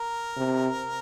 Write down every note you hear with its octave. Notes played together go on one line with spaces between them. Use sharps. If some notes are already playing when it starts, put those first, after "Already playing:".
Already playing: A#4
C3